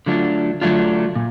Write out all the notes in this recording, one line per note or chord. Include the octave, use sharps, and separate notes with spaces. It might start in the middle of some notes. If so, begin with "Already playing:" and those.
D3 F#3 A3 D4 F4
D3 F#3 A3 D4 F4
A#2